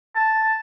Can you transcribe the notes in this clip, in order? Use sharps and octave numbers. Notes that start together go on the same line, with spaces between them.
A5